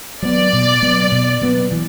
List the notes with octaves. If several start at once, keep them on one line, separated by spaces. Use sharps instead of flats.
F#3 B3 D5
B2
F#3 B3
B2
F#3 B3
E3